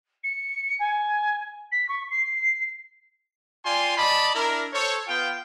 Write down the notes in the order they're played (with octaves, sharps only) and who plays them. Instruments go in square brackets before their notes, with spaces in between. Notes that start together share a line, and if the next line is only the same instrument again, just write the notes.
[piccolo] C#7
G#5
B6
C#6
C7
[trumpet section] F4 D5 G5 G#5 C6
D5 D#5 A5 B5
D4 E4 A#4
A4 C5 C#5
B3 F4 F5 G5